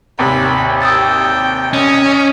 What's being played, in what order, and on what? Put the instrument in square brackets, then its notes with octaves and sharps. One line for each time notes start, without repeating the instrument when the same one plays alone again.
[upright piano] G#1 D#2 C3 [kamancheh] B5
[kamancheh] G5 [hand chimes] D#6 E6 A6
[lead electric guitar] C#4 [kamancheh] D#5